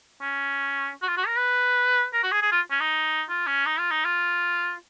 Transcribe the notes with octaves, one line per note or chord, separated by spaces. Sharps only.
C#4
F#4
F4
F#4
A#4
B4
A#4
F#4
G#4
G#4
F4
C#4
D#4
F4
C#4
D#4
F4
D#4
F4